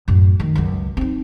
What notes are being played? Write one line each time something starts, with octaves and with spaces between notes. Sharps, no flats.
F#2 A2
D#3 A3
C#2 F#2
C4 D#4